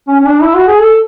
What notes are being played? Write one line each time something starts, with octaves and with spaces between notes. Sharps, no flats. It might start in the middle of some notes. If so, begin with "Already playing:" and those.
C#4
C#4
D4
E4
F#4
G#4
A4